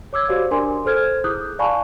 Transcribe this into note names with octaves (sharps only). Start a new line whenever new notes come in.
C#5 D6 E6 G#6
F#4 G4 C5 D5 F5
D4 A#4 D5 G#5 C6 D6
A4 C5 F6 G#6
E4 G#4 D6 D#6 F#6 G6
D5 F5 G#5 A5 B5 C#6